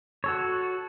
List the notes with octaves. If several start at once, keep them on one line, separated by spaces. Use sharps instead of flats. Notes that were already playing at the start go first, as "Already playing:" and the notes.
F#4 A4 C#5